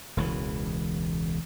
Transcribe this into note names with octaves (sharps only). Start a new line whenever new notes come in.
E1 C#2 E3